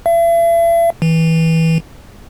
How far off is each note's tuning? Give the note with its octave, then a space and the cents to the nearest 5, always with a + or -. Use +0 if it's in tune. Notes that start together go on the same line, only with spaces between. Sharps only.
E5 +40
E3 -20